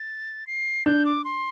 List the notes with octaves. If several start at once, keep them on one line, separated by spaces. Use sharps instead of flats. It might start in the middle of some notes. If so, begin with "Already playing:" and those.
Already playing: A6
C7
D4 G6
D6
C6